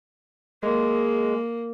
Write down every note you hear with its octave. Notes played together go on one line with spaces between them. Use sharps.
G#3 A#3